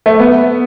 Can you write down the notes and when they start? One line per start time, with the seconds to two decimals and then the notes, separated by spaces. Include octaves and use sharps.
0.06 A3
0.20 B3